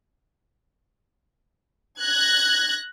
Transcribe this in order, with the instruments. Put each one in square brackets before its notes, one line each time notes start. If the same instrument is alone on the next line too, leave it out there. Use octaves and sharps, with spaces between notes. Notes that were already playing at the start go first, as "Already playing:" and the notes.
[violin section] F#6 G#6 A#6